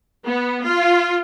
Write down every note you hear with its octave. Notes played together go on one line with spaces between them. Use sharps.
B3
F4